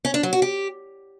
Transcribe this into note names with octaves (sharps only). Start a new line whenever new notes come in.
C#4
D4
F#3
F#4
G4